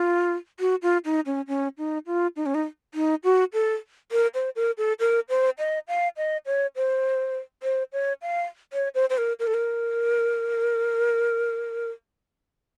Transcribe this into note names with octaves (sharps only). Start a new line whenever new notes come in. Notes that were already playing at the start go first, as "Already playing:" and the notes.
Already playing: F4
F#4
F4
D#4
C#4
C#4
D#4
F4
D#4
C#4
D#4
D#4
F#4
A4
A#4
C5
A#4
A4
A#4
C5
D#5
F5
D#5
C#5
C5
C5
C#5
F5
C#5
C5
C5
A#4
A#4
A4
A#4